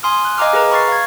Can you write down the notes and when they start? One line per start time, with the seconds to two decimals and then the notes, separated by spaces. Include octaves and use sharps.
0.03 G#5 C6 D#6 F6
0.25 F#6
0.38 D#5 F5 G#5 A#5 D6 F6
0.53 G#4 A#4 B4 A#5
0.71 B5 C#6 F6 A6 C7
0.88 F5 G#6